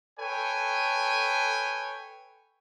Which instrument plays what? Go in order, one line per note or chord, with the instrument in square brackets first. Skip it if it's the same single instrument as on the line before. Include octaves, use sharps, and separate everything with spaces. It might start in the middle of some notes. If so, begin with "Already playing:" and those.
[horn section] A4 B4 C#5 G5 G#5